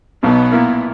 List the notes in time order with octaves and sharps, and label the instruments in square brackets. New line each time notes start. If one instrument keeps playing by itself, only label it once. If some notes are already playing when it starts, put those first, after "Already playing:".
[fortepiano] B1 B2 F#3 [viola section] B3
[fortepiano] A#2 A#3 E4 A#4